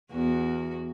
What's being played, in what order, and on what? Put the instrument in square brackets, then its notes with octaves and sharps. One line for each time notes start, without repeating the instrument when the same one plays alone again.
[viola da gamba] E2 F#4